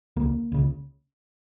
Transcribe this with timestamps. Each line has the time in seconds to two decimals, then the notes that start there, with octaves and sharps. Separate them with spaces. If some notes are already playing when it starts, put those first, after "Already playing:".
0.16 C#2 C#3 A#3
0.52 C#2 C#3